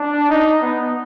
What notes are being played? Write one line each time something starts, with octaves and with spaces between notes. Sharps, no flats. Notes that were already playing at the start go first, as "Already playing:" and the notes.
Already playing: D4
D#4
B3